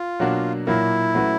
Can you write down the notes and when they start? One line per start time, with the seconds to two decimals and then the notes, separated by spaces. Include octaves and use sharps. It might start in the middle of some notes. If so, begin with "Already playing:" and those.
Already playing: F4
0.19 B2 F#3 A#3 D4 F#4
0.67 A#2 F#3 A#3 E4
1.14 F#3 A3 C#4 F#4 B4